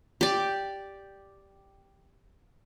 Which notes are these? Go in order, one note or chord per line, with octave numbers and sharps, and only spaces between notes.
G4 D5